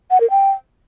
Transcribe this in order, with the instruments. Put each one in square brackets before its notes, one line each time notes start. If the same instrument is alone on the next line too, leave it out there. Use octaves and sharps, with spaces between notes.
[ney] F#5
A#4
G5